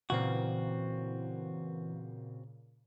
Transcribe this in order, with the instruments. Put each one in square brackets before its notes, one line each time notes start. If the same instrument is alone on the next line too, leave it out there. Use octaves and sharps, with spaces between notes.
[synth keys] A#2 C#3 [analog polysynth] E3 [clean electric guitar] C4 F#4